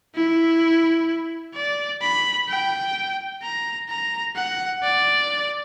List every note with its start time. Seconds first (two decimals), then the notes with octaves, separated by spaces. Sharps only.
0.15 E4
1.55 D5
2.02 B5
2.49 G5
3.42 A#5
3.89 A#5
4.36 F#5
4.83 D5